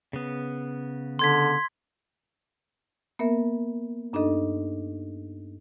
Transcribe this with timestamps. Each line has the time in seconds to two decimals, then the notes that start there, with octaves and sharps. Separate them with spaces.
0.13 C#3 B3
1.19 D3 C6 G#6 B6
3.19 A#3 B3 A#4 E5
4.13 G2 D4 D#4 A4 D#5